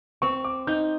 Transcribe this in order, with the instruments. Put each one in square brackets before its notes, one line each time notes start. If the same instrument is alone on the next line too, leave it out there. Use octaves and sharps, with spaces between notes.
[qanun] C4 [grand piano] C#6
[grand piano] D6
[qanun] D#4 [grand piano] G6